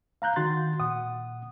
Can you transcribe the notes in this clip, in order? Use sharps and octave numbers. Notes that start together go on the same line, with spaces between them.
F5 A#5 F#6 G6
D#3 F#4 C6 A6
A#2 F#5 D#6